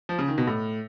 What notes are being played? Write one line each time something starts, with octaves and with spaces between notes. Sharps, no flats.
F3
C#3
D#3
B2
A2